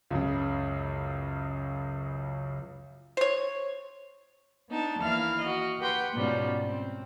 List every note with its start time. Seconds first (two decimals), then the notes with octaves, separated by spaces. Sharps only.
0.11 C#2 F#2 C#3
3.17 C5 C#5
4.70 B3 D4 D#4 A5
4.99 D#2 E3 E4 F5 F6
5.40 F#4 D#5
5.80 G4 B4 F#5 G5 C6
6.14 G#2 B2 F3 G3 C#4
6.63 C4